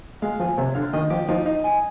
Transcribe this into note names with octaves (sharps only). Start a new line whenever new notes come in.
G#3 F5
F3 G#5
C3 C#5
D3 F5
D#3 D#5
F3 G4
F3 D#4
D#4
G#5